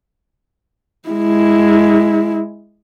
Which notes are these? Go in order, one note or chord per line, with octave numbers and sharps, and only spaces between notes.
G#3 E4